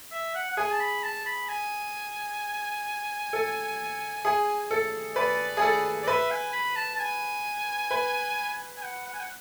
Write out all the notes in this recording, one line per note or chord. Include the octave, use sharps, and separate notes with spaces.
E5
F#5
F#5
G#4 G#5
A5
B5
A5
B5
G#5
A4
G#4
A4
B4 D5
G#4
A4
D5
B4 E5
G#5
B5
A5
A5
G#5
B4
G#5
F#5
F#5
G#5
F#5